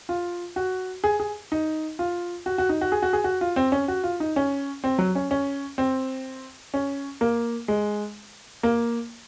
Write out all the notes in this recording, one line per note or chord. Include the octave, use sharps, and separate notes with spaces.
F4
F#4
G#4
G#4
D#4
F4
F#4
F#4
D#4
F#4
G#4
F#4
G#4
F#4
F4
C4
C#4
F#4
F4
D#4
C#4
C4
F#3
C#4
C#4
C4
C#4
A#3
G#3
A#3